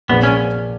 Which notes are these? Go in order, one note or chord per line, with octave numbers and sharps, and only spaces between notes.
A#1 A#2 F3 B3
C#4